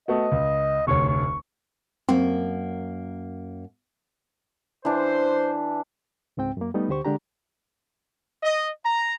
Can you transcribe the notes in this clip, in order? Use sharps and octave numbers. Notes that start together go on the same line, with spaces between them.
A3 B3 F#4 D#5
C#2
F1 D2 C#5 C#6
C#6
F#2 A#3 C4
E3 D4 C5
C#2 G#2 C4 G5
F#2 A#3
G3 A3 B3 D#4
D2 D3 G4 C5 C#6
D3 G#3 D4 G4 A#5
D#5
A#5